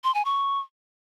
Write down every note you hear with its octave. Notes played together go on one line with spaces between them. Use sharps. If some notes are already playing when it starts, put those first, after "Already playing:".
C6
G#5
C#6